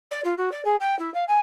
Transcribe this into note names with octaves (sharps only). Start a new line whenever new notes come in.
D5
F4
F#4
D5
G#4
G5
E4
F5
G#5